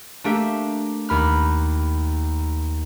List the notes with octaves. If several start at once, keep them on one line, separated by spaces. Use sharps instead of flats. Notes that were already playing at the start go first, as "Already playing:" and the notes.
A3 A#3 D4 G4 E5
D#2 B5 F6